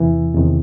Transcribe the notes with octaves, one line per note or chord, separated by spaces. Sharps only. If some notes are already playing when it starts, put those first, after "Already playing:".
Already playing: E2 C3 E3
E2 C3 D#3